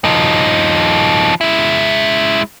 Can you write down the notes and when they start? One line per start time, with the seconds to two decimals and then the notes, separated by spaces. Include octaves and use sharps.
0.05 F3 D#4
1.41 G#3 E4